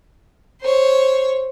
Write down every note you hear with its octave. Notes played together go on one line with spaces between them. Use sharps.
C5 C#5